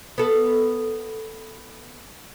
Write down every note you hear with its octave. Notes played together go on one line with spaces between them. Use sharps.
B3 A4